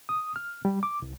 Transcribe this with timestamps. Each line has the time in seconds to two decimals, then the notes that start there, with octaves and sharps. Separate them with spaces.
0.09 D#6
0.36 F6
0.65 G3
0.83 D6
1.02 C2